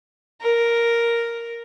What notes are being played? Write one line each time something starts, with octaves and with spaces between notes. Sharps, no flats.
A#4